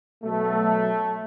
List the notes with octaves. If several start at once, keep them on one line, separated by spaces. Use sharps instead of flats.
B2 F#3 A3